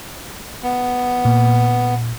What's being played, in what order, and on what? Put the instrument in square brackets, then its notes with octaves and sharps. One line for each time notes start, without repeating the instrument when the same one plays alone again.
[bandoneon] B3
[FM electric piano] A#2